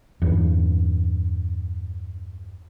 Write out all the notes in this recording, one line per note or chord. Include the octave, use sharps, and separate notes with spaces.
E2 G2